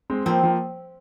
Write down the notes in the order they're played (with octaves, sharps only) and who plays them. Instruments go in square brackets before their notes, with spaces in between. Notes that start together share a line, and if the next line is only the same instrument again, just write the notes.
[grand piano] G#3 C4
[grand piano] F3 A#3 [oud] C4
[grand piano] F3 A#3